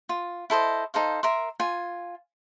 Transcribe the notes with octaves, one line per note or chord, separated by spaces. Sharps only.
F4
E4 A4 C5 D#5
D#4 A4 C5 F5
A#4 E5 C6
F4 G#5